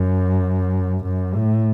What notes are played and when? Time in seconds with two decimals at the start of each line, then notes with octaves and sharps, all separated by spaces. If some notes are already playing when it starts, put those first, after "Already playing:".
Already playing: F#2
1.05 F#2
1.35 A2